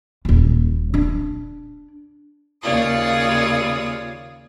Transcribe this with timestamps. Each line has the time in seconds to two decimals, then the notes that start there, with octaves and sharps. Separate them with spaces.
0.25 D#1 A#2
0.94 D4
2.61 D#2 C#3 F4 C#5 D5 D#6